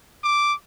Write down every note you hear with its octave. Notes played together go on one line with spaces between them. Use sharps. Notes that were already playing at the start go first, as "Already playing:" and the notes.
D6